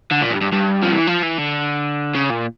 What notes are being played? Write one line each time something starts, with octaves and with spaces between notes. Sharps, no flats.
D3
A#2
G2
G2
G2
F3
E3
F3
E3
D3
C#3
A#2